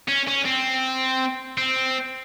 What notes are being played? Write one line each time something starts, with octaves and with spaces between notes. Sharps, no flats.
C#4
C#4
C4
C4